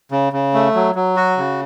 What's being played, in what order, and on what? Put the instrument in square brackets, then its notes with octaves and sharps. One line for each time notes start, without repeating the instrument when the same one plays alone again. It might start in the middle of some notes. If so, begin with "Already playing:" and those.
[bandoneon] C#3
C#3
A3
F#3
F#3
F#4
C#3